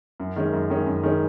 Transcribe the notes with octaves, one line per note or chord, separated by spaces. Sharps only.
F#2
D#3 G#3 C#4
F#2
D#3 G#3 C#4
F#2
D#3 G#3 C#4